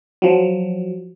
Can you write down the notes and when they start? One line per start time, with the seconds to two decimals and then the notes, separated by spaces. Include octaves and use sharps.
0.22 F3 F#3